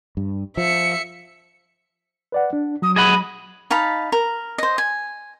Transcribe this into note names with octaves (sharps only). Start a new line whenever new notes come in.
G2
F3 E5 C#7
B4 D5 F#5
D4
F#3 D#6
G#4 D#5 F#5 B5
D#4 F5 A5 B5
A#4
C5 D#5
G#5